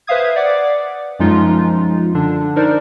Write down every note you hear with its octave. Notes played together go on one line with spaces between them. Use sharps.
B4 C5 E5 F5 D#6 G#6
D5 F#5 D6
F#2 F3 G#3 C#4 D#4 F4
D3 D4
D4 D#4 A#4 C5 D5